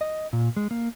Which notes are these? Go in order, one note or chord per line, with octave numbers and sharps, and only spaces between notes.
D#5
A#2
G#3
A#3